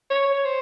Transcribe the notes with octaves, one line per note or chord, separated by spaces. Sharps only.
C#5
C5